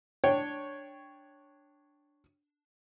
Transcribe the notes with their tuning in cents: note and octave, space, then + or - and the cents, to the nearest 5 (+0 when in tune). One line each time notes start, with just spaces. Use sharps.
D4 +0 C#5 +0 G5 +5